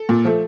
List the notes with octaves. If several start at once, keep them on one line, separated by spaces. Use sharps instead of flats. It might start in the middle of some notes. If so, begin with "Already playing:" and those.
Already playing: A4
A#2
F3 A3